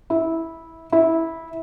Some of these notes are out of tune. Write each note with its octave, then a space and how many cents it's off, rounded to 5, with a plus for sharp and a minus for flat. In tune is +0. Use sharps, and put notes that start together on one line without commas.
E4 -15
E4 -15